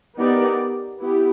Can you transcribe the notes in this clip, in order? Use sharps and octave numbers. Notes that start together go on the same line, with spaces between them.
B3 D#4 G4 A#4 D5
B3 E4 G4